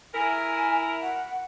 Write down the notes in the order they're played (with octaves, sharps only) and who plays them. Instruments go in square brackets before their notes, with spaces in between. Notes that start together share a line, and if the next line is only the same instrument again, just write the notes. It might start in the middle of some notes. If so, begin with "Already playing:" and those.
[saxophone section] E4 A#4 [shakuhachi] G#5
[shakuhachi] F#5